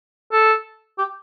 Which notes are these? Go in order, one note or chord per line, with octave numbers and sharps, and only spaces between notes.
A4
G4